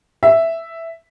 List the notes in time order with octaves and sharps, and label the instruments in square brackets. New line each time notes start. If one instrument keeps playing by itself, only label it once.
[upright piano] E5